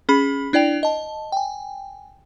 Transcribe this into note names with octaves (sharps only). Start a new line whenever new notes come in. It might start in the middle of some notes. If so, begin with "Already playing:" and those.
C#4 G#4 B5
D4 E4 D5 G5 F7
D#5 A5
G5 G#5